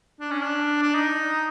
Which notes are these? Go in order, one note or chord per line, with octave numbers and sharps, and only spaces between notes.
D4
C#4
D4
D4
D#4